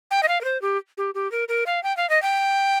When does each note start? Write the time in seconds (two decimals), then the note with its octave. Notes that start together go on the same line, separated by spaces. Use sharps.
0.11 G5
0.23 D#5
0.28 F5
0.41 A#4
0.44 C5
0.62 G4
0.97 G4
1.14 G4
1.31 A#4
1.48 A#4
1.66 F5
1.83 G5
1.97 F5
2.09 D#5
2.22 G5